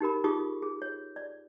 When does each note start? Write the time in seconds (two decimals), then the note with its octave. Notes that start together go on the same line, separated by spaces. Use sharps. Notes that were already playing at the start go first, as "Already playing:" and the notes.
0.01 D#4 G4 A#4 B5
0.24 D#4 F4 G4 G#4 C#6 D#6
0.62 G#4
0.82 C#5
1.16 D5